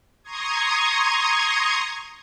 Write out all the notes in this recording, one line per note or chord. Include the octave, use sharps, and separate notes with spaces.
A#5 C6 C#6 D#6 G#6